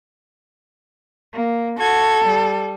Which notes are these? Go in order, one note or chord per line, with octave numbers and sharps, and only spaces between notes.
A#3
F#4 A4 G#6
G3